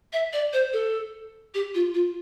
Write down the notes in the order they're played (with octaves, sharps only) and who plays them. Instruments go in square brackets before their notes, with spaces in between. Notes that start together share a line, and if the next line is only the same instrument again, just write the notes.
[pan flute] E5
D5
C5
A4
G4
F4
F4